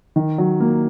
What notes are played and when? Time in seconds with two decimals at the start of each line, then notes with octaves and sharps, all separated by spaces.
0.16 D#3
0.38 F#3
0.60 A#3